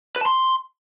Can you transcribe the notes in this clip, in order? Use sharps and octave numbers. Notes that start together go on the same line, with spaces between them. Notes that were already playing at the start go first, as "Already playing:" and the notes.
B4
A5
C6